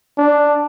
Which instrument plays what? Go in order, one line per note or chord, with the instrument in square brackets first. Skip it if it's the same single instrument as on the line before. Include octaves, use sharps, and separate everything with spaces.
[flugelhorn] D4